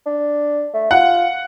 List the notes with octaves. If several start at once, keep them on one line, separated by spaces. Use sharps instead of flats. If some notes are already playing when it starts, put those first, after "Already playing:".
D4
A3
F4 F#5